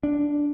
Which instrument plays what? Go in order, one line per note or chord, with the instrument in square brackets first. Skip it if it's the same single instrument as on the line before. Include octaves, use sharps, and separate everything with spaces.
[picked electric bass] D4